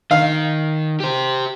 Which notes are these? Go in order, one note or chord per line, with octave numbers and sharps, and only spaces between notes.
D#3 F5
G4 C5